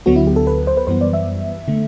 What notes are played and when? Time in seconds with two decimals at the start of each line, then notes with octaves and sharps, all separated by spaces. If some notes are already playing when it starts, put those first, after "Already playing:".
0.06 D2 D3 F#3 B3 F#4
0.16 E4
0.27 G4
0.36 A4
0.47 B4
0.67 C5
0.77 B4
0.87 F#2 E3 G3 B3 C5
1.01 D5
1.13 E5
1.68 D3 A3